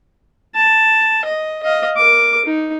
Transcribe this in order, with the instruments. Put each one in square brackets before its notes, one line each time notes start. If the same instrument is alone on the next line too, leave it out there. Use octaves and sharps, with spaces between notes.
[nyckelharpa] A5
D#5
D#5 F5
A#4 D6
D#4